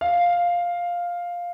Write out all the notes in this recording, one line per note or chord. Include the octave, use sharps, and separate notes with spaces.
F5